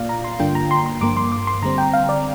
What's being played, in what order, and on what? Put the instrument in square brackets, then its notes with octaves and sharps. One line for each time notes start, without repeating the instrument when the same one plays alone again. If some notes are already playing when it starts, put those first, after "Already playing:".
Already playing: [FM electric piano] A#2 A#3 D4 F4 D5 F5
A#5
C6
G2 D3 A#3 D4 F4 G5
A#5
C6
C6
G2 F3 A#3 D6
C6
D6
C6
D3 G3 C4 A#5
G5
F5
D5